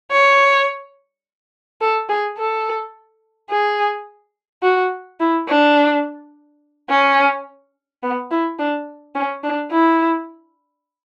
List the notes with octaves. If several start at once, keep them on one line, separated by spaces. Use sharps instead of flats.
C#5
A4
G#4
A4
G#4
F#4
E4
D4
C#4
B3
E4
D4
C#4
D4
E4